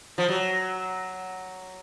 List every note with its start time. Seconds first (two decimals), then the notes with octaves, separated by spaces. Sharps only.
0.18 F3
0.29 F#3